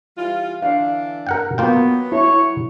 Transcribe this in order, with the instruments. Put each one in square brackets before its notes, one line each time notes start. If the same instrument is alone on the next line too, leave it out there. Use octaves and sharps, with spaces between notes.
[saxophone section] E3 G3 F4
[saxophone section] D3 E3 D4 [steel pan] F5
[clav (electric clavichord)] A#4 F#5 G5
[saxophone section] F#3 [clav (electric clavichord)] A#3 F4 G5 [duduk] B3
[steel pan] E4 [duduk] C#5